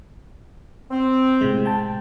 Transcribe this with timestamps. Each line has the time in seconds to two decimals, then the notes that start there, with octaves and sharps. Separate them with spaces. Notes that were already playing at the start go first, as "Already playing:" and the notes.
0.91 C4
1.41 A2 C3 G#3
1.66 G5 A5